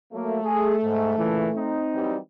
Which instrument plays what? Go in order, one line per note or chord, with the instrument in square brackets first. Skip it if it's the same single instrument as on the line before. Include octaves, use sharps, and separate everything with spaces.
[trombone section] F#3 A#3 [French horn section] A3
[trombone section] G#4
G#2
A#2 C#3 E3
C4 D#4
[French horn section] E3 F#3 G3